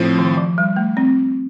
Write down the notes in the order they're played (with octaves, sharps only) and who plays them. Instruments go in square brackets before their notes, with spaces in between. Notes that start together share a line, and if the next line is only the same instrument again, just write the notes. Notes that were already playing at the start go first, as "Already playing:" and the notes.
Already playing: [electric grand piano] A2 F3 C4
[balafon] D#3
F3
G3
A3
C4